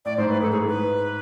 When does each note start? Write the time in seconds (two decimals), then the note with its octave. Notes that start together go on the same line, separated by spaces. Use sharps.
0.05 A2 D5
0.17 G#2 C5
0.29 A2 B4
0.42 G#2 A4
0.51 G#4
0.54 A2
0.65 G#2 B4